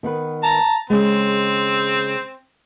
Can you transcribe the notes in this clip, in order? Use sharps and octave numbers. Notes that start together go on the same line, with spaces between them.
D#3 B3 B4
A5 A#5
C#3 G#3 C4